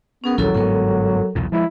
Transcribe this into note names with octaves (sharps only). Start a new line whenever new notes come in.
B3 C#4 G#4 A#4
A#1 D#2 F#3 E4 A4 E6
G1 G#2 B3 A4 A#4
B1 E2 A#2
F3 G#3 E4